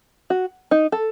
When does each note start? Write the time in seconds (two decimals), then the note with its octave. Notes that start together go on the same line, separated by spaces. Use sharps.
0.30 F#4
0.71 D#4
0.92 A4